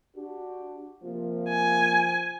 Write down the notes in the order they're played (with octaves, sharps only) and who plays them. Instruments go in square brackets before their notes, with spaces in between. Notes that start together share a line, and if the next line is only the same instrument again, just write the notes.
[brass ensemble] D4 F#4 G4
C3 F3 A#3
[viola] G#5